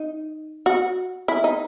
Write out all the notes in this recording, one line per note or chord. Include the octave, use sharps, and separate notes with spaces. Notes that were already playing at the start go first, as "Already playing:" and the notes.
Already playing: D#4
F#4
E4
D#4